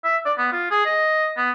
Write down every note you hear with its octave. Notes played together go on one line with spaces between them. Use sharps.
E5
D5
B3
F4
G#4
D#5
B3